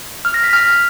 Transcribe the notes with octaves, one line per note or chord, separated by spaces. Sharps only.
F6
A#6
B6
F6